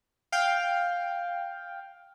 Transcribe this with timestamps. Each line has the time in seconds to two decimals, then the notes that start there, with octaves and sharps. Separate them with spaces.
0.32 F5 G5